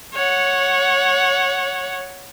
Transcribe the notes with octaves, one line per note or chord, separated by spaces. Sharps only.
C#5 F#5